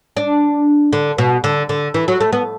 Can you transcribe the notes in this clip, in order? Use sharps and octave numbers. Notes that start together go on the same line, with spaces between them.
D4
D3
B2
D3
D3
E3
F#3
A3
B3